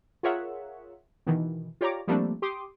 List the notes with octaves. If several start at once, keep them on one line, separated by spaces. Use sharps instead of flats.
F4 G#4 A#4 C#5 E5 F#5
B2 D#3 E3
F4 G4 C#5 D5 A#5 D6
F3 G3 A3 A#3 C4 D4
G4 C6 D6 D#6